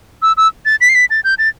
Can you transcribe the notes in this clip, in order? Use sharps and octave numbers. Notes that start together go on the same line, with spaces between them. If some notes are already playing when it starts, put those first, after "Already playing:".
E6
E6
A6
B6
C7
B6
A6
G6
A6